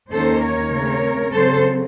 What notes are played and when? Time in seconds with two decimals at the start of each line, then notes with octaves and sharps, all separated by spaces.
0.11 D#2 D#3 A#3 C#4 A4 C5
0.42 A#4 C#5
0.73 C#3 A3 C4
1.34 C#3 F#3 C4 A4 C5